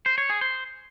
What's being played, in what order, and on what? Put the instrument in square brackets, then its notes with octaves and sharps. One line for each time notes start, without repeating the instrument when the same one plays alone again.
[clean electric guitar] C5
C#5
G#4
C5